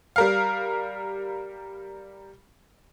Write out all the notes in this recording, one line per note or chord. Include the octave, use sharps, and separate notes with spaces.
G3 A#4 F5